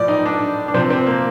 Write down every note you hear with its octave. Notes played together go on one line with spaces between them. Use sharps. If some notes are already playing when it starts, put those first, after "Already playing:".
Already playing: A2 F3 D5
D#4
D4
D4
C3 F3 C4
C4
A#3